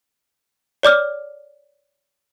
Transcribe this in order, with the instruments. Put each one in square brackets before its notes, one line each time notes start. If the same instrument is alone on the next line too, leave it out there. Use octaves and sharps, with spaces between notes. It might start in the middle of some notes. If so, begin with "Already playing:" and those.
[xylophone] C#5 D5 D6 F6